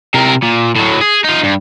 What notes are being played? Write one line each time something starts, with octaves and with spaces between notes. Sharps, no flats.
C3 A#4
A#2
A2 F#3
G#4
D#4 F4
G2